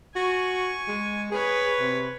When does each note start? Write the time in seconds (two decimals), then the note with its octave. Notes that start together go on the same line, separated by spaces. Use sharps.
0.16 F#4 G#5 C#6
0.88 G#3
1.32 G#4 B4 C#5
1.80 C3